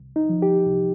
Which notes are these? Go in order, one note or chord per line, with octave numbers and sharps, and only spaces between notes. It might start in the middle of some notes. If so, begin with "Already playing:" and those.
Already playing: C2
D#4
F3
G4
C2